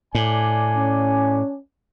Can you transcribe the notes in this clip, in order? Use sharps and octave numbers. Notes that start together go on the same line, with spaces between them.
A2 D4 D5 G#5
C#4